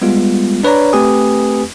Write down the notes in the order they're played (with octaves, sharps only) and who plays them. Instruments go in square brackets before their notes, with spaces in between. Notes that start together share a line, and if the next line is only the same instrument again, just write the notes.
[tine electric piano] G3 G#3 B3 F4
D4 B4 C#5 D5 A#5
A3 C4 G4 B4 G#5 D#6